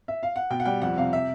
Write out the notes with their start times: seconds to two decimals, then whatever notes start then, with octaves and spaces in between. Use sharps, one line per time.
0.08 E5
0.23 F5
0.36 F#5
0.50 B2 G5
0.60 F#5
0.65 G3 G5
0.82 F2 F#5
0.97 C3 F5
1.13 E5